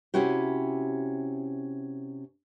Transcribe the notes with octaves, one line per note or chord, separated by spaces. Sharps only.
C3 C#4 E4 F#4 G4